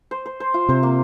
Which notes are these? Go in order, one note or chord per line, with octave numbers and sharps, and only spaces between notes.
C5
C5
C5
F4
C3 C5
A#3